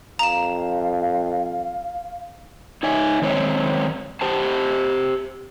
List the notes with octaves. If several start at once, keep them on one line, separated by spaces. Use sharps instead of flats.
F2 F5 A#5 E7
D#4 C#5 E5 G#5
D#3 G#3 C4 C#5
G4 C5 A5